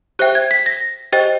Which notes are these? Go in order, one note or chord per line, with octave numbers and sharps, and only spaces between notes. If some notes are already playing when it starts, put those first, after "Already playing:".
G4 C5 E5 G5 F#6
G#6
B6
A#6
G4 C5 D#5 G5 A6